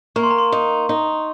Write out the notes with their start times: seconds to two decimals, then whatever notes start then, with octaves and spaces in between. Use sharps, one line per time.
0.16 A#3 C#6
0.23 C6
0.31 A#5
0.38 C6
0.52 D#4
0.89 D#4